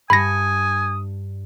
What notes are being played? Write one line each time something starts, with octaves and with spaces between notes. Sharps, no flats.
G2 D4 G#5 B5 D#6 A#6 C#7